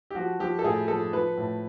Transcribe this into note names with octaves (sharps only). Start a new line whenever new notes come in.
G4
F3 F#4
F3 G4
A4
A2 G#4
F3 A4
F3 B4
A2